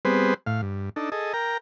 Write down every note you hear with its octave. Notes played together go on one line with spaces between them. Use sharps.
G3 B3 C4 G#4 B4 C5
A2 F5
G2
D4 D#4 A4
G#4 A4 D#5
A#4 G5 A#5